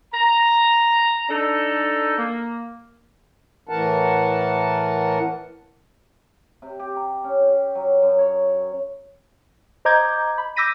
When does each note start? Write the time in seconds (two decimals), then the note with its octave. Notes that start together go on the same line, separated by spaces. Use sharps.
0.13 A#5
1.30 D4 D#4 A4
2.17 A#3
3.69 A2 E3 A#4 F#5 A5
6.62 C3
6.79 G4
6.96 A#5
7.24 C#4
7.50 G4
7.75 F#3
8.02 F#2
8.19 C#5
9.85 C5 D#5 A#5 D6 G6 G#6
10.38 B5
10.56 D6 E6 G6 A#6 B6 D#7